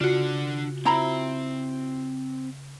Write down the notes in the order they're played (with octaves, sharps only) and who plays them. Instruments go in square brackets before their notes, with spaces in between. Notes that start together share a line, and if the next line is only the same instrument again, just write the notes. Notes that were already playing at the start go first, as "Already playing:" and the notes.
[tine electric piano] C#3 [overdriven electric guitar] D4 F#5 [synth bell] F4 F#4
[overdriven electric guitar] C4 [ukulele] E4 A#5 B5